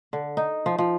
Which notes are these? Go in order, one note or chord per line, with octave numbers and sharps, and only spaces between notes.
D3
D#4
F3
F3